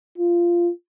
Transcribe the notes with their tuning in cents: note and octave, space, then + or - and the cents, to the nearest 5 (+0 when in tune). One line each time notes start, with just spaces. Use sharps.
F4 -15